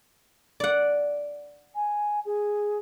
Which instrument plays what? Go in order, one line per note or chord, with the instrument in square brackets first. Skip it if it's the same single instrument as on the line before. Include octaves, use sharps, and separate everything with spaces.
[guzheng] D5 F#5
[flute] G#5
G#4